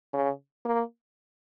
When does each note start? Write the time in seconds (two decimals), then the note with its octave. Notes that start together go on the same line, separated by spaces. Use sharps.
0.14 C#3
0.65 A#3